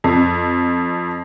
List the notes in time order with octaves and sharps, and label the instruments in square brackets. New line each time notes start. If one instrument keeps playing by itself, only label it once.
[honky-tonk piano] F2